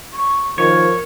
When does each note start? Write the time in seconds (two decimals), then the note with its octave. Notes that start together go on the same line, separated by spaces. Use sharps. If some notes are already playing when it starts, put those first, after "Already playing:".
0.13 C#6
0.58 D#3 F3 A#4 C#5